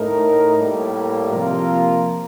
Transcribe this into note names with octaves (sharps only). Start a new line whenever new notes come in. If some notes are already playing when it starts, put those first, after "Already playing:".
Already playing: A2 A3 D#4 A#4
A2 G3 A#3
C3 F3 A#3 F4 A#4